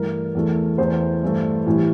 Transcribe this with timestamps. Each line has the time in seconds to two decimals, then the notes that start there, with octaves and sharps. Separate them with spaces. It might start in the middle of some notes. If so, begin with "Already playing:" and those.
Already playing: G2 E3 A3 A#4
0.35 E2 E3 A3
0.78 E2 E3 A3 C5
1.23 G2 E3 A3
1.66 A2 E3 G3